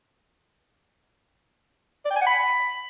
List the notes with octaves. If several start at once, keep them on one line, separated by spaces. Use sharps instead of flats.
D5
G5
G#5
F#5
B5